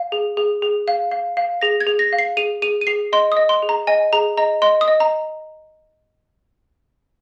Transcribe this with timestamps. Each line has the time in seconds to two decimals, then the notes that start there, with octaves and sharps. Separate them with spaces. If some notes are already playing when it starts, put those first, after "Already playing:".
Already playing: F5
0.12 G#4
0.37 G#4
0.62 G#4
0.88 F5
1.11 F5
1.37 F5
1.61 G#4 A#6
1.81 G#6
1.87 G#4
1.99 A#6
2.13 F5
2.19 C7
2.37 G#4 D#7
2.62 G#4 D#7
2.81 D#7
2.87 G#4 C7
3.13 D#5 C6
3.32 D#6
3.37 D#5
3.49 C6
3.62 G#4
3.69 A#5
3.87 D#5 G#5
4.13 G#4 A#5
4.37 D#5 A#5
4.62 D#5 C6
4.81 D#6
4.88 D#5
5.00 A#5